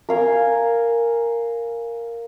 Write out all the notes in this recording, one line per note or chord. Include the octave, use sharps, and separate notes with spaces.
A#4 F5 G#5